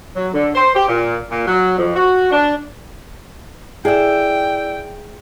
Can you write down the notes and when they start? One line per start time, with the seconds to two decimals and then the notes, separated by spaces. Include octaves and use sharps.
0.15 F#3
0.34 D3
0.55 C5
0.75 G4
0.88 A#2
1.30 A#2
1.47 F#3
1.77 F2
1.95 F#4
2.31 D4
3.85 E4 G#4 D5 E5 G5 E6